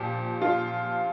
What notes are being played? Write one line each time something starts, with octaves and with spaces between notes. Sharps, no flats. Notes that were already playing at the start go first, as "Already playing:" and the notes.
Already playing: A#2 F3 G4
F4